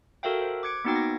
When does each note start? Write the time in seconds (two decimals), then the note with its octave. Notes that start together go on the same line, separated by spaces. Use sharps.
0.23 F#4 A4 A#4 E5 F5 G5
0.42 C5
0.63 D6 F#6 G#6 C#7 D7
0.84 A#3 B3 D#4 F#4 G5 G#6
0.96 A#6